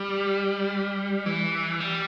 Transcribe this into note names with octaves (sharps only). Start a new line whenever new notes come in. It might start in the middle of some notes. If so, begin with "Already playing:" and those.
Already playing: G3
E3
G3